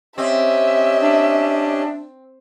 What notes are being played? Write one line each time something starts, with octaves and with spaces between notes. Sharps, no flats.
C4 C#4 G4 D#5 E5
D4